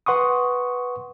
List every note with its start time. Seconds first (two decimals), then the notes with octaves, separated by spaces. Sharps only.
0.06 B4 F#5 C6 C#6 D#6